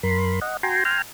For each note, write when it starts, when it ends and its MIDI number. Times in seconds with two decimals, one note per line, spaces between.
0.03 0.40 42
0.03 0.40 70
0.03 0.40 83
0.03 0.40 84
0.41 0.57 75
0.41 0.57 78
0.63 0.84 66
0.63 0.84 79
0.63 0.84 80
0.63 0.84 82
0.63 0.84 84
0.85 1.02 79
0.85 1.02 80
0.85 1.02 82
0.85 1.02 84
0.85 1.02 89